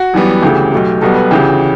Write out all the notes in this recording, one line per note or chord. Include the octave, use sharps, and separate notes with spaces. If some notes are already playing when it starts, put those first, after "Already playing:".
Already playing: F#4
F#2 E3 G3 B3
D2 C#3 E3 A3 G4
B1 B2 A3
B1 B2 G3 B3 A4
B4
D2 C#3 E3 G4